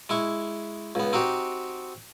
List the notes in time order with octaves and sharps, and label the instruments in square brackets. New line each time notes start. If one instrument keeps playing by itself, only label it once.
[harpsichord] G#3 E4 C#6
C#2 B3
C4 D#4 F#4 G4